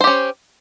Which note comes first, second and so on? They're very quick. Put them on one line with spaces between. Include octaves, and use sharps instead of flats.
C5 G4 C#4